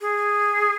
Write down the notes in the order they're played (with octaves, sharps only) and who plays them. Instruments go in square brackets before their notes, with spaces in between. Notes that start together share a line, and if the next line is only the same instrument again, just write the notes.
[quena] G#4